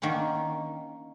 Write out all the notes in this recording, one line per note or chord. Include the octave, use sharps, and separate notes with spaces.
D#3 A#3 C#4 D4